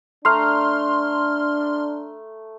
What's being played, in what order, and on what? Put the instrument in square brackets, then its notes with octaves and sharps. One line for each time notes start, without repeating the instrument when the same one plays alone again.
[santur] A3 A#5 [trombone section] D4 [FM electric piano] C6 F6